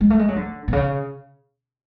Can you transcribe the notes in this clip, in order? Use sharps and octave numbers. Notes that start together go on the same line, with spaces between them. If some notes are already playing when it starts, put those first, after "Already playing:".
G#3
A3
G#3
F#3
D3
B2
C#3